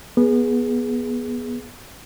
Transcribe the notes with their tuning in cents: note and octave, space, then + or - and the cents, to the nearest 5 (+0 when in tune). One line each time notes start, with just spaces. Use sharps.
B3 -20 G#4 +0